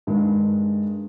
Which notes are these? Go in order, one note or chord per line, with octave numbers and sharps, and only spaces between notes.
G2 D#3 G#3